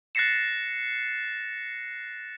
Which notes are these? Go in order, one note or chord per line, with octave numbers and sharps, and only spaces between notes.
F#6 A6 A#6 C7 C#7 E7